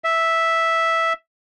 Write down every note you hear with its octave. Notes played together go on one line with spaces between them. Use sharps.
E5